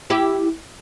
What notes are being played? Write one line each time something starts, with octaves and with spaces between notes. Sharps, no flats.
E4 G4